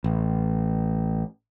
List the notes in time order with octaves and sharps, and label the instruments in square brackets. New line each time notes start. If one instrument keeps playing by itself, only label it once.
[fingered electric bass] A1